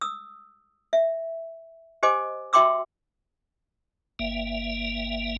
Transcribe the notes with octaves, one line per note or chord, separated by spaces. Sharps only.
D#6 E6
E5
G4 C5 D#5 G#5 D6
F#4 E5 G5 C6 D6 E6
G1 A#3 E5